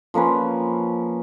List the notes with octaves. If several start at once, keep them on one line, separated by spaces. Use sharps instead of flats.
F3 A#3 C#4 B4